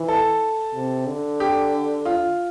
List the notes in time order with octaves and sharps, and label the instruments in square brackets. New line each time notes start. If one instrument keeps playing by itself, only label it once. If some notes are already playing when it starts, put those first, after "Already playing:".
Already playing: [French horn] E3
[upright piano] A4
[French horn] C3
D3
[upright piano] G4
F4